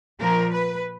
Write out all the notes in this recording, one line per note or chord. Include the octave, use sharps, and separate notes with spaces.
A#2 F3 A#3 A#4
B4